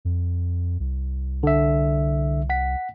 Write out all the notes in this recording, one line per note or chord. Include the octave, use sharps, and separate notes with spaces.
F2
C2
D3 E5
F#5 B6